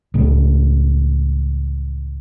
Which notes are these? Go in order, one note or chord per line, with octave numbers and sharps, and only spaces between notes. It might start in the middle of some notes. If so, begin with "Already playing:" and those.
C#2 A2